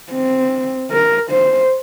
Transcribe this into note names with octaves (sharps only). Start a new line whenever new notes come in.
C4
A#4
C5